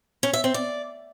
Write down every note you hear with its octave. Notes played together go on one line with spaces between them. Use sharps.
C#4
E5
C4
D5